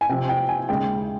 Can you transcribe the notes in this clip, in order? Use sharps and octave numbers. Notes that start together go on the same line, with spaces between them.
G#5
C3 F3 C4 G5
G5
G#5
D#2 C#3 G#3 G5